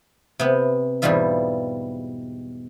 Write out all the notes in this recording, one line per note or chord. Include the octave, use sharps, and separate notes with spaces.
C3 B3
E2 G#2 B2 G3 F4 E5